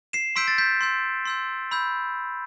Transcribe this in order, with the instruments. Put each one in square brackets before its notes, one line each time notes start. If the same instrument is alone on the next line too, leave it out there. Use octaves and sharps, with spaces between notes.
[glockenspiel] C7 E7
C6 E6 G6 B6 D7
A6
G6 B6
C6 E6 G6
C6 E6 G6
B5 E6 G6